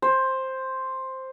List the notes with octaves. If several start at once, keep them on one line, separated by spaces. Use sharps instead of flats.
C5